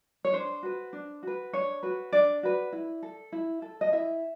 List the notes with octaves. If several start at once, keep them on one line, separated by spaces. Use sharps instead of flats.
C#5
D4 C5
F#4 B4
D4
F#4 B4
D4 C#5
F#4 B4
D4 D5
F#4 B4
E4
A4
E4
A4
D#5
E4 E5